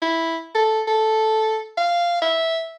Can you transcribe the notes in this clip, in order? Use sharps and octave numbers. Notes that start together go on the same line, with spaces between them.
E4
A4
A4
F5
E5